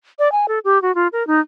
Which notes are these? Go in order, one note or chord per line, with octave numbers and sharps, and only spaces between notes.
D5
G#5
A4
G4
F#4
F4
A#4
D#4